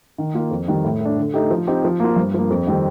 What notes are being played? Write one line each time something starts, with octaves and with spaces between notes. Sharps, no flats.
D#3
A#3 F4
F2
D#3 G3
A2
A3
D4
D3
A3 D#4 G4
F3
C4 D#4 G4
F3
A#3 F4
G2
F3 A#3
F2
D#3 G3 C4